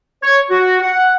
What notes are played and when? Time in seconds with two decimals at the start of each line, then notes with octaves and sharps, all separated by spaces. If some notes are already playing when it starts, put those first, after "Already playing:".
0.23 C#5
0.50 F#4
0.82 F#5